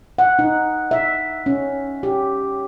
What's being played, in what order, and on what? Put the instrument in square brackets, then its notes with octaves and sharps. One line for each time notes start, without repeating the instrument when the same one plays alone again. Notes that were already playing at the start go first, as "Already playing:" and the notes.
[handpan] F#5
D#4
E5
C#4
G4